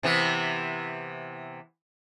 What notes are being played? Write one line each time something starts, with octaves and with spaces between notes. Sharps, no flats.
C3 E3 B3